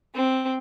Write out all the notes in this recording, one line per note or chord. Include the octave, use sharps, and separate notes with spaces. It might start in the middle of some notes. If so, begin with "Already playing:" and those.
C4